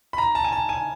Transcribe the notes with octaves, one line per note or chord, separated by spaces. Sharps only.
B5
A#5
A5
G#5
A5
G#5